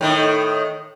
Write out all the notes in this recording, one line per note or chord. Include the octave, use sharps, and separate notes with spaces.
A2 D#3